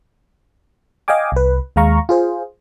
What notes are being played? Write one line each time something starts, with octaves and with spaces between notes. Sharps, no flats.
D#5 F5 G5 G#5 D6
C2 B4
D#2 G#3 F5 A#5 C#6
F4 G#4 C5